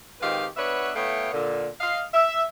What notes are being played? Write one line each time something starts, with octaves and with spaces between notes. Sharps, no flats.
G#2 D#3 C4 G4 B4 F5
B3 D4 F#4 B4 C#5 E5
A3 B3 E4 C#5 F5 G5
A#2 D3
D#5 F5
E5